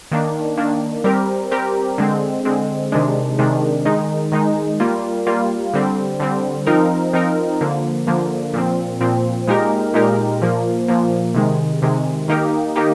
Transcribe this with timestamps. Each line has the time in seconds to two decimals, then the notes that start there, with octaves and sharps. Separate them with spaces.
0.11 D#3 A#3 D4
0.58 D#3 A#3 D4
1.04 G3 C4 G4 A#4
1.51 G3 C4 G4 A#4
1.98 D3 G#3 C4
2.45 D3 G#3 C4
2.92 C3 D#3 G#3 D4
3.39 C3 D#3 G#3 D4
3.85 D#3 G#3 D#4
4.32 D#3 G#3 D#4
4.80 G3 A#3 F4
5.27 G3 A#3 F4
5.74 D3 G3 C4
6.20 D3 G3 C4
6.67 F3 C4 D#4 A#4
7.13 F3 C4 D#4 A#4
7.61 D3 F3 A#3
8.07 D3 F3 A#3
8.54 A#2 F3 C4
9.00 A#2 F3 C4
9.47 A#2 G#3 D#4 G4 A#4
9.94 A#2 G#3 D#4 G4 A#4
10.41 A#2 F3 A#3
10.88 A#2 F3 A#3
11.34 C3 D#3 G#3
11.82 C3 D#3 G#3
12.28 D#3 A#3 D#4 G4 A#4
12.76 D#3 A#3 D#4 G4 A#4